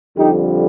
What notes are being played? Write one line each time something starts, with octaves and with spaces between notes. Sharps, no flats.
F2 D3 G3 D#4 G4